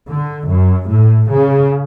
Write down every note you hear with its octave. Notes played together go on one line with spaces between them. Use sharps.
D3
F#2
A2
C#3